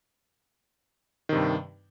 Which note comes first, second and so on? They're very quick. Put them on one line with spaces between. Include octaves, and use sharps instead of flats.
D#3 C3 G2